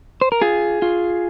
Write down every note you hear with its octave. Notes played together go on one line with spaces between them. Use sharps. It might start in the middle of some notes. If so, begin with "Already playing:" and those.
C5
A#4
F4 G#4
F4